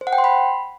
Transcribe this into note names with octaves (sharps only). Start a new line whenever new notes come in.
C5
F#5
G5
C6
B5